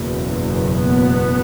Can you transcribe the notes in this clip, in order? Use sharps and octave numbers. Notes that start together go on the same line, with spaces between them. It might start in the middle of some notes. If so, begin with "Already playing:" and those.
Already playing: F#1 E2 B2
B3